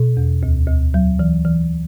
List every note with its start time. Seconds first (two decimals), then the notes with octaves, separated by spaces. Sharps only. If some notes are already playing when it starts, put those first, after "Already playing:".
Already playing: B2
0.17 E2
0.43 D2
0.68 D2
0.94 F#3
1.19 E3
1.45 E3